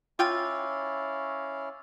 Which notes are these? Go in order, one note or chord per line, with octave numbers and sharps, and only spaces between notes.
C#4 E4 F4 F5 G5 D6 E6 A6